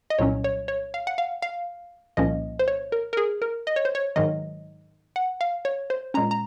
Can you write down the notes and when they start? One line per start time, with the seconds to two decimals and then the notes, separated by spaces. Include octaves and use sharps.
0.10 D#5
0.19 C2 A#2 F#3 C#4 C#5
0.44 C#5
0.68 C#5
0.94 F5
1.07 F#5
1.18 F5
1.42 F5
2.17 C2 A#2 F3 A#3 C#4 D#5
2.59 C5
2.68 C#5
2.92 A#4
3.13 A#4
3.17 G#4
3.42 A#4
3.67 D#5
3.76 C#5
3.85 C5
3.95 C#5
4.16 G#2 D#3 F#3 D#5
5.16 F#5
5.41 F5
5.65 C#5
5.90 C5
6.14 A#2 G#3 C#4 A#5
6.31 A#5